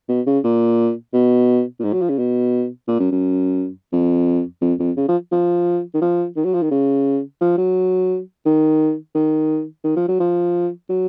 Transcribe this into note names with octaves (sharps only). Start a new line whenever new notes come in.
B2
C#3
A#2
B2
A#2
G#2
F#3
F3
C#3
B2
A#2
F#2
F#2
F2
F2
F2
C#3
F3
F3
D#3
F3
D#3
F#3
F3
D#3
C#3
F3
F#3
D#3
D#3
D#3
F3
F#3
F3
F#3